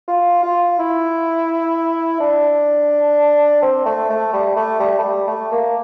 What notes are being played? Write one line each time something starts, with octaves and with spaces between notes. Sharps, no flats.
F4
F4
E4
D4
C4
A3
A3
G3
A3
G3
A3
G3
A3
A#3